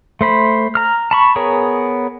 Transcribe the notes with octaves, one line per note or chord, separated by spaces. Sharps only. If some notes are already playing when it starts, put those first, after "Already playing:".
A3 C5 B5
A#5 F6
A5 B5 C#6
B3 G#4 A#4 C#5